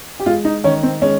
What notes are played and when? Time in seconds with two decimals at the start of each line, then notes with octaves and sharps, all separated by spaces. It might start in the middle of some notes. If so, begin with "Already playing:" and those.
0.20 G4
0.26 G#3 F4
0.45 D#4
0.64 D#3 C#4
0.83 C4
1.02 G#3 C#4